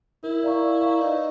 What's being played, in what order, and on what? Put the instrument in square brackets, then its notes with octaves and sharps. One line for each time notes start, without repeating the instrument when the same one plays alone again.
[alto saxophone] E4 [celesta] A#4
[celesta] D5 F5 A#5 C#6
A#4
D5 F5 A#5 C#6
[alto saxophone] D#4 [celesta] B4